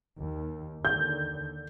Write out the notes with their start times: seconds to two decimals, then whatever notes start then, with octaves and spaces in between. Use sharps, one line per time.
0.20 D#2
0.85 D#2 D3 G6